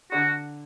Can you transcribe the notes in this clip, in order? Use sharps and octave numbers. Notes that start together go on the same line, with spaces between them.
D3 F#4